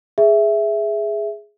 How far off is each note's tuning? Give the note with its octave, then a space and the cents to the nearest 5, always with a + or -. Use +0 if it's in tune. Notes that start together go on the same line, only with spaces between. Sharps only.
G#4 +0 E5 +0